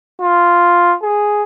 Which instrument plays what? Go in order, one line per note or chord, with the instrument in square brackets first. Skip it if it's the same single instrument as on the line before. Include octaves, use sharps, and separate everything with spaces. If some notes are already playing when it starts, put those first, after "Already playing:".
[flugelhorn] F4
G#4